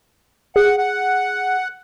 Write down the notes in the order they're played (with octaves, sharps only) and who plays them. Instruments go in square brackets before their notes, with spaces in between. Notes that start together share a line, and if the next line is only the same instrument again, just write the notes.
[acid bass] G#4 [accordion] F#5
[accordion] F#5